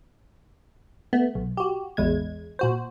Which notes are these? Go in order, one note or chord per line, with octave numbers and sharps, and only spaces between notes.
A3 B3
B1
F#4 G4
A1 E2 G#3 G#6
A#2 F#4 C5